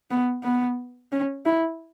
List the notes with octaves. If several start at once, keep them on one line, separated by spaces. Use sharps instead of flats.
B3
B3
C#4
E4